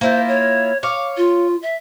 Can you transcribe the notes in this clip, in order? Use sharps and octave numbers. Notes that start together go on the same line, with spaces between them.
A#3 E4 F4 C5
C#5
C#5 F5 D6
F4
E5